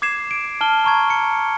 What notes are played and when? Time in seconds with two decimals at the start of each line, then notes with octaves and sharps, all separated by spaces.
0.02 D6 G#6 C7 E7
0.31 D7
0.61 A5 F6 G7
0.84 A#5 C#6 G#6
1.10 C#7